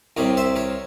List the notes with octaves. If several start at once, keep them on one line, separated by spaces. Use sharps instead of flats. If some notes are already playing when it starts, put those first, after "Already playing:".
C2 C3 G3 A#4 C#5
C5 E5
A#4 C#5